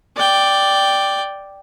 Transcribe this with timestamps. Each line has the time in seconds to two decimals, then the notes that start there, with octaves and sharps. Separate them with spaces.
0.17 D5 G5